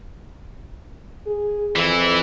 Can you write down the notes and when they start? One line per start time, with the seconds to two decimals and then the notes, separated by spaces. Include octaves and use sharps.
1.26 G#4
1.75 F2 E3 E4